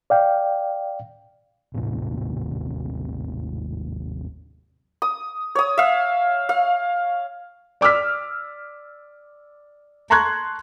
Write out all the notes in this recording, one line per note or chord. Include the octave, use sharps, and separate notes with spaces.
D5 F5 G5
G#1 D#2 A2 C3
D#6
C#5 D#6
E5 F5
F5
D5 D6 E6 F6 B6
A5 A#5 C6 C#6 F#6 G#6